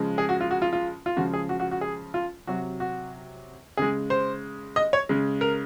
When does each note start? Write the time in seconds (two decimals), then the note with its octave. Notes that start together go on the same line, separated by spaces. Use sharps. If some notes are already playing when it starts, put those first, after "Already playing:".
Already playing: C#3 F3 G#3
0.18 G#4
0.29 F#4
0.41 F4
0.51 F#4
0.62 F4
0.73 F4
1.06 F4
1.17 C#3 F3 G#3 F#4
1.34 G#4
1.49 F#4
1.60 F#4
1.71 F#4
1.81 G#4
2.14 F4
2.47 C3 F#3 F#4
2.80 F#4
3.77 C#3 G#3 G#4
4.10 C5
4.76 D#5
4.93 C#5
5.09 C#3 G#3
5.41 A#4